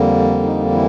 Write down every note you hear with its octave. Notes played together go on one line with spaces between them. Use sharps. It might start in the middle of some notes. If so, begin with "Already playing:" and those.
Already playing: F2 D3 G3 A#3
D#4
E3 E4